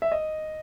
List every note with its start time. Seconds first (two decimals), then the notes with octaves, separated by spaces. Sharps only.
0.02 E5
0.12 D#5